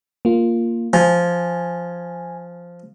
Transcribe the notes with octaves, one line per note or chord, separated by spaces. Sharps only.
A#3 F4
F3 G#5